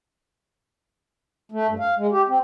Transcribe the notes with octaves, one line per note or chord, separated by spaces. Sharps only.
A3
G2
F5
G#3
G4
C4